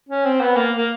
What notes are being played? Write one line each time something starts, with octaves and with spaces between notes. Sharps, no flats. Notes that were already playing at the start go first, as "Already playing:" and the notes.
C#4
C4
B3
A#3
A#3